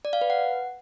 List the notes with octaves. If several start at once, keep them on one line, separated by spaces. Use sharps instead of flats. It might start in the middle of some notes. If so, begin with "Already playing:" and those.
D5
F5
B4
F#5